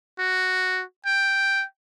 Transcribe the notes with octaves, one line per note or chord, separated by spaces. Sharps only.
F#4
G5